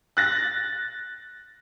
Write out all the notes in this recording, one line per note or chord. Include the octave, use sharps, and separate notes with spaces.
F#6 A6 A#6